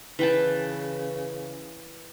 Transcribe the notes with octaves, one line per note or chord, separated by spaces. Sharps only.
C#3 E3 G5 A5